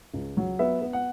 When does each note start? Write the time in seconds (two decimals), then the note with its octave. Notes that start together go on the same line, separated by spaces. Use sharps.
0.14 C#2
0.37 F#3
0.59 B3 E5
0.82 B3
0.93 F#5